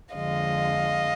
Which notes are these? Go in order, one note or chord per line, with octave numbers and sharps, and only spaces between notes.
F2 D3 F3 G#3 D#5 F5